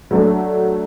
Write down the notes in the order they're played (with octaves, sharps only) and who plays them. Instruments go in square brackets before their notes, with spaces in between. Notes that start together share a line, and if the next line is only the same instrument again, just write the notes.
[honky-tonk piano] F#3 A3 D4